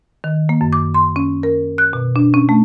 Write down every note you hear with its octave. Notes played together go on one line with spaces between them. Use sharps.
D#3
A#3
F#2
D6
C6
C#4
A#4
F#6
B2
D4
C#4
A3